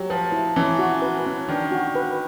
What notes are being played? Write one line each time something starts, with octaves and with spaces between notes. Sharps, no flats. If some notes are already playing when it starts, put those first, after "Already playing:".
Already playing: F#3 G4
F3 B4
E4
E3 C#4
F#4
B4
C#4
D#3 D4
F#4
B4